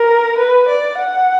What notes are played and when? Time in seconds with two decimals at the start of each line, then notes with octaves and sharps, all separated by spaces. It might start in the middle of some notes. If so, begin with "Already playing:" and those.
Already playing: A#4
0.38 B4
0.68 D5
0.98 F#5